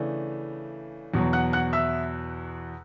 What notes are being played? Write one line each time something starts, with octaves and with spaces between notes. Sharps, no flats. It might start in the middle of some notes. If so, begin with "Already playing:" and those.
Already playing: C#3 E3 A3 D4
E2 B2 F#3
F#5 F#6
F#5 F#6
E5 E6